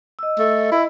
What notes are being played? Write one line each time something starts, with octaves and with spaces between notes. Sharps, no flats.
D#5 E6
A3
E4